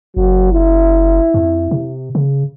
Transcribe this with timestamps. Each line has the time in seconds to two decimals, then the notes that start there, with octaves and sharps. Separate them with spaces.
0.17 F#1 F#3
0.52 E4
1.34 F2
1.71 C3
2.15 C#3